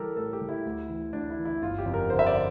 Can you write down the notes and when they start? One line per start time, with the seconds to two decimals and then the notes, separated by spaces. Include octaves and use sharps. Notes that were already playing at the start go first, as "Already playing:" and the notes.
Already playing: E3 G3 G4 A4 A#4
0.16 A2 A4
0.33 G4
0.41 G3
0.49 E4
0.65 D2
0.89 E3
1.13 D2 D4
1.30 E4
1.38 E3
1.45 E4
1.62 G1 F4
1.78 G4
1.86 F2
1.94 A#4
2.10 D3 C5
2.19 E5
2.26 D5